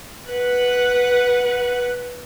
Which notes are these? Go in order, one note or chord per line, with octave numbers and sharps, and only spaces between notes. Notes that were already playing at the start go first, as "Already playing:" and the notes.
B4 F#5